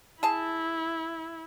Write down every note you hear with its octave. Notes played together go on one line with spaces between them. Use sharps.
E4 G#4 A5